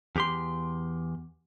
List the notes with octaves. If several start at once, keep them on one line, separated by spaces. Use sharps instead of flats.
E2 G4 C6